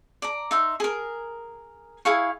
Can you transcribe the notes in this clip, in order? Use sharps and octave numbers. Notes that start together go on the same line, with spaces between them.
D5 A#5
D#4 E5 C6
G#4 A#4
E4 G#4 F5 C#6